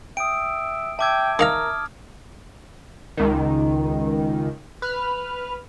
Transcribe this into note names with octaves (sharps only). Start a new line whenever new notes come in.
E5 G5 D#6 D7
E5 G5 A5 D6 E6 G#6
D#3 A#4 F5 A#5 D#6 F6
C#2 D#3
B4 F6